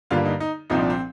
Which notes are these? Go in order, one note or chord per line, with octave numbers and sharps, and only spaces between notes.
G2 D3 G3 A#3 F4
D#4
D#4
C2 A#2 F3 C4 D#4
D4
C4